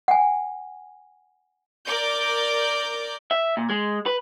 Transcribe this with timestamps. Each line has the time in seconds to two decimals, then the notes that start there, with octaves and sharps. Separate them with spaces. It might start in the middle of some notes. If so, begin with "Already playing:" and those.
0.08 F#5 G#5
1.85 A#4 D5 D6 G6
3.31 E5
3.57 A#2
3.70 G#3
4.06 B4